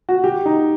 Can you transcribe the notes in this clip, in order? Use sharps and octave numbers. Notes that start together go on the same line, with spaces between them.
F#4
G4
D#4